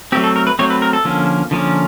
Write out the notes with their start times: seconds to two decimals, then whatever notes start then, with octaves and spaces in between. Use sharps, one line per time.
0.12 F#3 A3 C4 G4
0.24 A4
0.36 A#4
0.47 B4
0.59 F#3 A3 C4 C#5
0.70 B4
0.82 A#4
0.93 A4
1.05 D3 F3 A#3 C#4
1.51 D3 F3 A#3 C#4